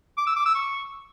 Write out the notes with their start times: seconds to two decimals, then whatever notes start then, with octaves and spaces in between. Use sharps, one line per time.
0.17 D6
0.27 E6
0.36 D6
0.46 E6
0.55 C#6